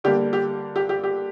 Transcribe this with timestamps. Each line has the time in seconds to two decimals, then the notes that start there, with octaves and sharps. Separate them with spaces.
0.04 D3 G3 A#3 G4
0.33 G4
0.76 G4
0.89 G4
1.03 G4